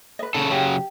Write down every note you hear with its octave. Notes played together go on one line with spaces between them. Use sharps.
B4 D#5
C#3 C#4 D4 A4
C#3 F#3 G4